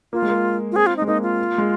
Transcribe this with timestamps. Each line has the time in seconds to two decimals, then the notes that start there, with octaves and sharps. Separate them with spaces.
0.13 A#3 F4
0.22 G#3
0.28 A#3
0.72 F4
0.76 C4 G#4
0.86 F4
0.97 D#4
1.02 G#3
1.07 A#3 D#4
1.23 F4
1.58 G#3